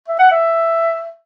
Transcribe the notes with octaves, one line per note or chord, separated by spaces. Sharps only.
E5
F#5
E5